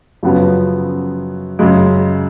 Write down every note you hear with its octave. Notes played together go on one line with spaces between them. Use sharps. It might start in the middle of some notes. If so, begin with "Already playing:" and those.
F#2 C#3 F3 B3 F#4
F#2 C#3 G#3